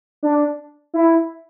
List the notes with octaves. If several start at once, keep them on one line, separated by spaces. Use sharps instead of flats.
D4
E4